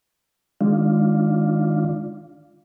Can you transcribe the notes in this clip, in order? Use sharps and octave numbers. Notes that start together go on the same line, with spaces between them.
D#3 G#3 D4 F4